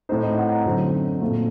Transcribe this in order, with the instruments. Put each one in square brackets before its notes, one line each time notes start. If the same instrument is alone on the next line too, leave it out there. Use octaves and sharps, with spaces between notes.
[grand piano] A2 A3 C4 D#4 C5
D#5
F#5
A#5
F#2 D3 F#3 C4 D#4
A#2 A3 C4